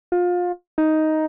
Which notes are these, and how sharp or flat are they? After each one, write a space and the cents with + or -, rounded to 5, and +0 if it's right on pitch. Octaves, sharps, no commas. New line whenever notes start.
F4 +25
D#4 +5